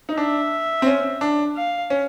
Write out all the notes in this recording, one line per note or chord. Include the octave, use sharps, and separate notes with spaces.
D#4
D4 E5
C4
C#4
D4
F5
C#4